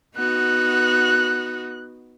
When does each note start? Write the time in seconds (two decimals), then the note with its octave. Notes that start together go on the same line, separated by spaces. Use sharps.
0.17 B3 D#4 F#4 F#6